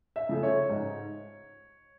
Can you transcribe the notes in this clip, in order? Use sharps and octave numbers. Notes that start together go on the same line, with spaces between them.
E5
C#3 F3 A3
C#5
G#2